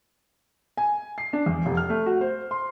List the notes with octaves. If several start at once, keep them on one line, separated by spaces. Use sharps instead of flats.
G#5
C7
D4
E2
F1
F6
A3
F#4
C5
C6